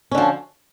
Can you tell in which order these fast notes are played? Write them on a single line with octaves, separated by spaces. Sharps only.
C#4 D3 F3